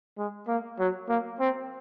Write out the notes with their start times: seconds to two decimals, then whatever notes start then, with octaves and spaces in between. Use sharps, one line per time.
0.18 G#3
0.48 A#3
0.79 F#3
1.09 A#3
1.40 C4